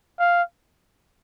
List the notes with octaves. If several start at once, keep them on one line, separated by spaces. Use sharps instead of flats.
F5